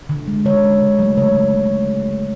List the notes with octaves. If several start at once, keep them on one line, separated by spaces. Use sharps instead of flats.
D3
G#3
D3 C#5
G#3
C#3
F#3 A3
C#3 C#5